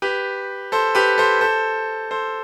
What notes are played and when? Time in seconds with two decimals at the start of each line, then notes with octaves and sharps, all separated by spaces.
0.02 G4 B4
0.72 A4 C5
0.95 G4 B4
1.18 A4 C5
1.41 A4 C5
2.11 A4 C5